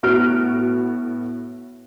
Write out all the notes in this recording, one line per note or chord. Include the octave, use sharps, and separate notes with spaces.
A2 B3 F#4 F6 D7